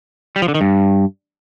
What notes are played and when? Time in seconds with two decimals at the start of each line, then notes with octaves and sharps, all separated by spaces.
0.36 G3
0.42 F3
0.48 D3
0.55 D#3
0.61 G2